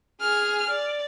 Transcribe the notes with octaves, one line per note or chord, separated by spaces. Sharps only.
G#4 F6
D5